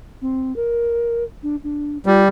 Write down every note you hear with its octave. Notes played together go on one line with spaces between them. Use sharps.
C4
A#4
D4
D4
G3 F4